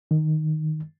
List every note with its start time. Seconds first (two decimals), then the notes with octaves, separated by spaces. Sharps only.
0.11 D#3